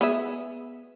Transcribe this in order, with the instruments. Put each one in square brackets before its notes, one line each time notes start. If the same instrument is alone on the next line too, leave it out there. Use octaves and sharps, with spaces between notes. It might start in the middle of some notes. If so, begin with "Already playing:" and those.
[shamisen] B3 G#4 E5